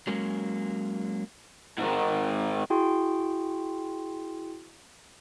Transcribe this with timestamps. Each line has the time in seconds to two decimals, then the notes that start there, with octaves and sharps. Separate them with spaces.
0.07 F#3 G#3 A#3 C#4
1.78 G#2 D#3
2.70 E4 F#4 G#4 G5 C6